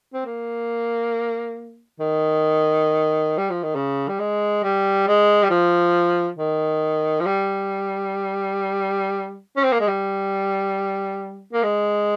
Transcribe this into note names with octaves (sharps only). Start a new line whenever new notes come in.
C4
A#3
D#3
G3
F3
D#3
C#3
G3
G#3
G3
G#3
G3
F3
D#3
F3
G3
C#4
C4
A#3
G#3
G3
A#3
G#3